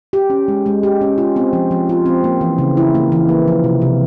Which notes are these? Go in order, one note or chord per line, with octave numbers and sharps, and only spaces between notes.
G4
C#4
G#3
G#3
G4
C#4
F4
C4
F3
F3
F4
C4
A#3
E3
C#3
E4
A#3
E3
A#3
F3
C3
C3